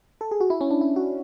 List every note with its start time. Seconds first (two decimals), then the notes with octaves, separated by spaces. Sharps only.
0.21 A4
0.31 G#4
0.40 F#4
0.50 E4
0.61 C#4
0.71 D4
0.81 E4
0.96 F#4